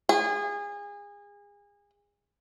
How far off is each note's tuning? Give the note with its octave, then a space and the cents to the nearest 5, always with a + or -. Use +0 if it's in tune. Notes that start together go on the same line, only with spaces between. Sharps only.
G#4 -30